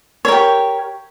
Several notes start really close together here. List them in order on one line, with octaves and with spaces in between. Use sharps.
C#5 A#4 G4